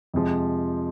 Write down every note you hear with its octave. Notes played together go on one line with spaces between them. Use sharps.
F2 C3 F3 G#3